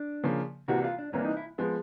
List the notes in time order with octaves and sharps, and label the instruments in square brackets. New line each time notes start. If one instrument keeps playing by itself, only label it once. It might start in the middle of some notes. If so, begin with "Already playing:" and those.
Already playing: [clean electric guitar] D4
[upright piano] C#3 F3 A#3
[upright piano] C2 C3 E3 G3 A#3 [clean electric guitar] F#4
[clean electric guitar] F4
D4
[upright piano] C2 C3 E3 G3 A#3 [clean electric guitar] C#4
[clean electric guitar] D#4
E4
[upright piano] F3 G#3 B3